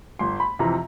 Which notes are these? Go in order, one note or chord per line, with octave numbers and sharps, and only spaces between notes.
G1 C6
B5
F2 C3 E3 A#5